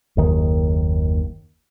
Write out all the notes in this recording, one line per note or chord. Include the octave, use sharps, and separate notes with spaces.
F#1 D#2 D#3